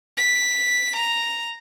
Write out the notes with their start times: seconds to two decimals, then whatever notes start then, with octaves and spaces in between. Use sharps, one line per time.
0.17 B6
0.96 A#5